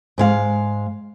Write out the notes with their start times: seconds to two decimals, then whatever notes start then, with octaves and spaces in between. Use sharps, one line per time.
0.18 G#2 G#3 F5